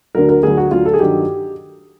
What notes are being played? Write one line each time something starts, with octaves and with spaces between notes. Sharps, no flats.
D2 D3 F#3 A#4
A#4
D2 D3 F#3 G#4
F#4
D2 D3 F#3 F4
A4
G#4
G2 D#3 F#3 G4